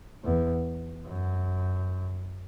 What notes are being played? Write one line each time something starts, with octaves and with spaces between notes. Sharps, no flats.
E2
F#2